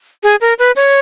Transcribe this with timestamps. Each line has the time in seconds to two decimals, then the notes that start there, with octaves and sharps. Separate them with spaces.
0.23 G#4
0.41 A#4
0.59 B4
0.76 C#5